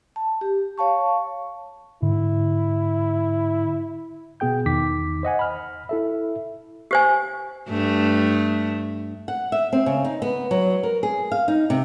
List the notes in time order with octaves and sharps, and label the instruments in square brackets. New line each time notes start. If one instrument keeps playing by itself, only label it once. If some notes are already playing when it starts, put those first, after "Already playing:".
[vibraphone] A5
G4
C#5 F5 A5 C#6
[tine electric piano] G#2 D3 [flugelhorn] E4
[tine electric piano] B2 B3 G#4 G5 G6
E2 D#3 D#4 D6 B6
C5 D#5 F#5 G#5
B5 F6
E4 A4 E5
[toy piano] G4 C5 G#5
[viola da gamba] G2 A3
[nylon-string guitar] F#5
E5
C4
C#3
D#4
B3
F#3
A#4
G#4
F5
D#4
C3